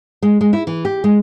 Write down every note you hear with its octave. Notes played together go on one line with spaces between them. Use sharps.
G#3
G#3
E4
E3
G4
G#3